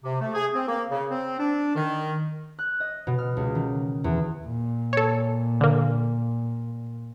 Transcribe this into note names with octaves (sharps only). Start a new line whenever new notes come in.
C3
A3
G#4
C4
A#3
C#3
C4
D4
D#3
F#6
D#5
B2
F6
C#2
D#3
E2
A#2
A4 C#5
D3 A#3